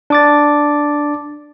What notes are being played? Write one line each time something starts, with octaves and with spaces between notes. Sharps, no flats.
D4 D6 A6